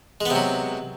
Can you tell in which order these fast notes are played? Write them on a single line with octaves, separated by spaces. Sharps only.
G#3 B3 C3 F#3